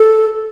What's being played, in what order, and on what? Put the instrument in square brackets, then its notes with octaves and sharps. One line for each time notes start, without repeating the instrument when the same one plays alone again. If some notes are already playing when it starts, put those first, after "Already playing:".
Already playing: [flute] A4